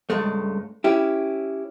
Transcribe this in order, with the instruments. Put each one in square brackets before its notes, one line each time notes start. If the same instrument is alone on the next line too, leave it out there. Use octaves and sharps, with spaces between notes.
[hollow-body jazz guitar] C#2 G2 G#3 A3
C#4 E4 G4